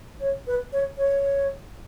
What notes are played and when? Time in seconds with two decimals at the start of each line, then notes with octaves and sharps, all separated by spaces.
0.20 C#5
0.47 B4
0.72 C#5
0.97 C#5